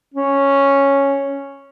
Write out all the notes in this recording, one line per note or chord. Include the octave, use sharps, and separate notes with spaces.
C#4